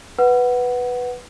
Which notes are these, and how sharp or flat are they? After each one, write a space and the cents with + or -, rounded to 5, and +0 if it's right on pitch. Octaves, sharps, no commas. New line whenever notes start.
B4 +0 F#5 +0